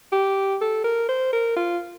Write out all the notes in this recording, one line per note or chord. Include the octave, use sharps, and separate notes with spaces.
G4
A4
A#4
C5
A#4
F4